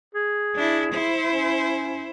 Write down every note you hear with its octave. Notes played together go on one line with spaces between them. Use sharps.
G#4
D4 E4
E4 C5
C#4